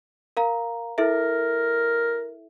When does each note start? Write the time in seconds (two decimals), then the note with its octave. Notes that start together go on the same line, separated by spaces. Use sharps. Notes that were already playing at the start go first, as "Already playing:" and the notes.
0.37 A#4 F5 A#5
0.98 E4 A4 A#4 E5